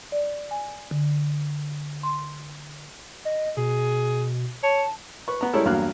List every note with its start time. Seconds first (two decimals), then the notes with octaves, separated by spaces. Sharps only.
0.12 D5
0.51 G#5
0.91 D3
2.03 C6
3.25 D#5
3.57 B2 G#4
4.63 C#5 A5
5.28 B4 C#6
5.41 B3 A#5
5.53 G3 G#3 C#4 E4 A4 A#4
5.65 E2 G2 F#3 A#3 F6 F#6